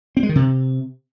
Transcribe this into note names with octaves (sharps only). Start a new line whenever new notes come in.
C4
G#3
D#3
C3